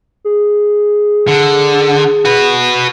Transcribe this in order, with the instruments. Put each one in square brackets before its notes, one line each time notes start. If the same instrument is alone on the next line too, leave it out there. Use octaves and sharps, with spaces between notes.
[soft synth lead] G#4
[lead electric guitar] D3
F#4 B4